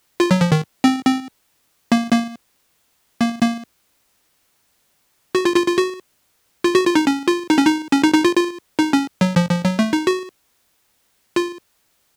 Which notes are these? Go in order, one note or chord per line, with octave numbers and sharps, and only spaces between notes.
F4
F#3
F3
D#3
C4
C4
A#3
A#3
A#3
A#3
F#4
F4
F4
F4
F#4
F4
F#4
F4
D#4
C#4
F4
D#4
C#4
D#4
C#4
D#4
D#4
F4
F4
D#4
C#4
F#3
F3
F3
F#3
A3
D#4
F#4
F4